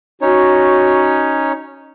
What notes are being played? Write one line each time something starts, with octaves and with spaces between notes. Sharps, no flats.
C#4 D#4 F#4 C#5